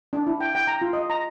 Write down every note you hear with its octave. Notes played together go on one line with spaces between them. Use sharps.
D4
E4
G5
G5
A#5
F4
D#5
A#5